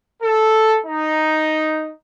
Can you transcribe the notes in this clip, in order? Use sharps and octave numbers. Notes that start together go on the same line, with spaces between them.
A4
D#4